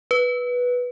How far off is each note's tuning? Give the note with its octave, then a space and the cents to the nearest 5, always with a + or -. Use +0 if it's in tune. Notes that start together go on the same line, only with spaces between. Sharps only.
B4 -5